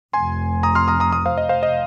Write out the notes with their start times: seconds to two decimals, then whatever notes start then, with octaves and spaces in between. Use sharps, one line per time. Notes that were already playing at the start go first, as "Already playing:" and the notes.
0.13 F1 F2 C3 G#5 C6
0.63 A#5 D#6
0.75 C6 F6
0.88 A#5 D#6
1.00 A#5 D#6
1.12 A#5 D#6
1.25 C5 F5
1.38 D#5
1.49 C5 F5
1.63 D#5